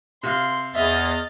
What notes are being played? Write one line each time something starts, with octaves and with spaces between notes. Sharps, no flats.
C3 F5 C6
E2 D#5 E5 F6 A6